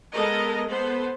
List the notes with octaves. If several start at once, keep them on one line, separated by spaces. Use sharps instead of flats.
G#3 B3 A4 A#4 D#5
B3 A4 C5